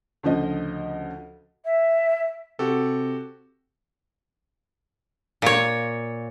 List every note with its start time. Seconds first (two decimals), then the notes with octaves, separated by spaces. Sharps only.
0.23 D2 C#3 F3 D#5
1.65 E5
2.59 C3 F#4 G4 A4
5.42 A#2 C#5